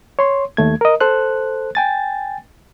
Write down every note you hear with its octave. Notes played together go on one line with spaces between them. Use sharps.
C#5 C6
D#2 A3 G#6
A#4 D#5
A4 C5 F#6
G5 G#5 A6